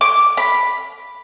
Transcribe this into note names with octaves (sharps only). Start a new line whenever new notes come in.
D6
B5